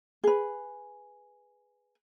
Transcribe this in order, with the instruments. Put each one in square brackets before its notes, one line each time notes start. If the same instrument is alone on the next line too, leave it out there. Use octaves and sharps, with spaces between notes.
[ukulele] G#4 B4